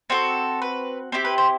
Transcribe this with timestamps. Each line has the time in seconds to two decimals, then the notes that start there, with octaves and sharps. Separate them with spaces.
0.10 C4 F#4 A4
0.62 B4
1.12 C4 E4 G4
1.25 B4
1.38 C5